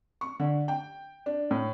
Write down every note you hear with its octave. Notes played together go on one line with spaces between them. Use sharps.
C#6
D3
G5
D4
A2